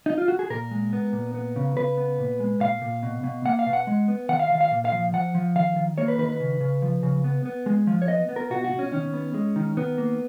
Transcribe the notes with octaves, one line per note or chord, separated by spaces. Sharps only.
D#4
F4
F#4
G#4
A#2 A#4
G#3
B3
A#2
B3
C#3
C#3 B4
B3
A#2
G#3
A#2 F5
A#2
B2
B2
A#3 F#5
F5
B2
F#5
G#3
B3
D#3 F#5
F5
D#3 F5
F5
A#2
F5
F3
F3 F#5
F3
D#3 F5
D#3
A#3 C#5
B4
D#3 B4
B4
C#3
C#3
F3
C#3
B3
B3
G#3
F3
C#5
B3 D#5
B3
A#4
B2 F#4
F#4
B2
C#4
D#3 C#4
B3
G#3
D#3
D#3 B3
A#3